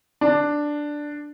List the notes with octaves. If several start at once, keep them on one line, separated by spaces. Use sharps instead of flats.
D4